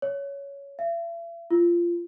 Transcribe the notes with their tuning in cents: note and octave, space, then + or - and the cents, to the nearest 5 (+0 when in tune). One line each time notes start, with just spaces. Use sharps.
C#5 +15
E5 +40
F4 -20